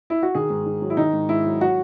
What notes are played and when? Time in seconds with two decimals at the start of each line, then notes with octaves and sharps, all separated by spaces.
0.10 E4
0.23 F#4
0.35 D#3 G#4
0.50 G#2
0.66 G#2
0.82 F#3
0.90 E4
0.97 D#3 D#4
1.13 G#2
1.29 G#2 E4
1.45 F#3
1.61 F#3 F#4